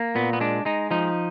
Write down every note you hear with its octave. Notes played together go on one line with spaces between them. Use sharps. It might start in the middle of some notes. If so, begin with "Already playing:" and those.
Already playing: A#3
A#2 B3
B3
G#3 D4
G#3 D#4
F3 D#4